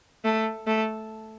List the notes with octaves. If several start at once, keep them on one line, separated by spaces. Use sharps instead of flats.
A3
A3